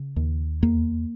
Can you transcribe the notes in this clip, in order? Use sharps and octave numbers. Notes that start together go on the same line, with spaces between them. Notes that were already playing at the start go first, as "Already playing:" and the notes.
Already playing: C#3
D#2
E2 A#3